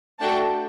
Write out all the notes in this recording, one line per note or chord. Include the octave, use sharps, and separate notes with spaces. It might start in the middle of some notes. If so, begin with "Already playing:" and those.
A3 D4 F#4 A4 G5 A5